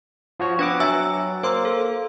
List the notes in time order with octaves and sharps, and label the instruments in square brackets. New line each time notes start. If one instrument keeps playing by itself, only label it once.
[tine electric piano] F3 F#4 C#5
[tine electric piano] B3 F#5 D6 [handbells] D4 B4 A#6
[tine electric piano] F#3 [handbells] E5 G#5 E6
[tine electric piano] A#3 [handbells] C5 C6 E6
[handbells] A4